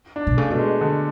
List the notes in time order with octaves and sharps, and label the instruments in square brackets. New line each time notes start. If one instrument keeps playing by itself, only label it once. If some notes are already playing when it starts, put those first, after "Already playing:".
[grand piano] D4
[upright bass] B2
[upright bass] C#3 [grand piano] A3
[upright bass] B2 [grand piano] A3
[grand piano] G#3
D3